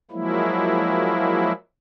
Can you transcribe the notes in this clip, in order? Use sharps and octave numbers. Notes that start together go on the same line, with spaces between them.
F3 F#3 G#3 A#3 E4